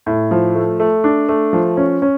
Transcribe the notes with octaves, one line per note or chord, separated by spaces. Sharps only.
A2
F3
A3
A3
D4
A3
F3
C#4
C#4